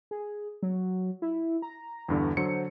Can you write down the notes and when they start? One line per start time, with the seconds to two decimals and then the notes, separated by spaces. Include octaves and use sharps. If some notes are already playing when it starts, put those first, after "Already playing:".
0.11 G#4
0.63 F#3
1.22 E4
1.62 A#5
2.09 E2 G2 D3
2.37 D3 F#3 C5 C#7